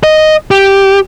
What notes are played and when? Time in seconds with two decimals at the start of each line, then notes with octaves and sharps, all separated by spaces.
0.03 D#5
0.51 G4